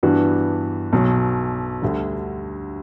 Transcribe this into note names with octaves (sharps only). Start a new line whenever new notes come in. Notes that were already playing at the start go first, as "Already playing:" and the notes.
G2 E3 B3 D4 F#4
B1 B2 F#3
D2 D3 G3